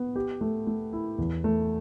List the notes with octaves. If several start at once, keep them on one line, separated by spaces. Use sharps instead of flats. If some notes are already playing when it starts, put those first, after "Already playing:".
Already playing: B3
G4
A3
A3
E4
E2
A3